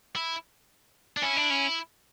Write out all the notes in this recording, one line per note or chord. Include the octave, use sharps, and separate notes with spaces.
E4
D4
C#4 E4
D4
C#4